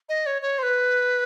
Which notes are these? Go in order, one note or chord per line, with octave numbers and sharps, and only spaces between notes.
D#5
C#5
C#5
C5
B4